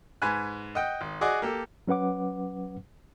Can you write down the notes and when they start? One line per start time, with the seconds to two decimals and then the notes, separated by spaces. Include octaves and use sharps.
0.22 G#2 B4 G#5 F#6
0.75 D#5 F#5 G5
1.01 G#1
1.21 F#4 G#4 D5 D#5 F#5
1.42 A#3 G4 A4
1.88 F#3 C#4 B4 F#5 D6